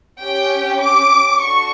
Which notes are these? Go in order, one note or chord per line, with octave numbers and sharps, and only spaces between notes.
C#4 G4 G5
D6
D4 F#4 A4 C#6